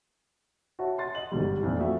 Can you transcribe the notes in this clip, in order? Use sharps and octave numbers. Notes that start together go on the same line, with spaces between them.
F#4 C#5 E5 A5
C6 A6
D#5 F#7
G1 G#2 G3
F2 A#2 E4
F3 A3 F#4 A4 E5